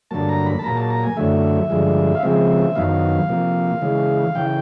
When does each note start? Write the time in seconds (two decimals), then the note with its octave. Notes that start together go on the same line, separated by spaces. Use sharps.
0.11 G2 D3 F#3 A#3 A5
0.29 A#5
0.46 B5
0.59 A5
0.63 A#2 F#3 A#3 A#5
0.77 A5
0.90 A#5
1.03 G#5
1.17 F#2 D3 F#3 A3 E5
1.70 G2 D3 F3 G#3
2.15 F5
2.23 C#3 F3 G#3 C4 E5
2.76 F#2 D#3 F#3 B3 F5
3.29 C3 F3 A#3
3.82 C#3 E3 G#3
4.35 C#3 E3 G5